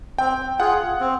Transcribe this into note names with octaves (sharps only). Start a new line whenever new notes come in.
C4 G5
F4 G#4 F#5
C4